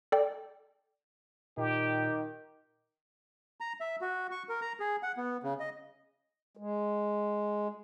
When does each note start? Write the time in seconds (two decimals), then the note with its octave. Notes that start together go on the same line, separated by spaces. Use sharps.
0.12 A4 D5 G5
1.57 A#2 D#3 G4
3.60 A#5
3.81 E5
4.01 F#4
4.31 C#6
4.49 A#4
4.62 A#5
4.80 G#4
5.03 F#5
5.17 B3
5.43 C#3
5.60 D#5
6.57 G#3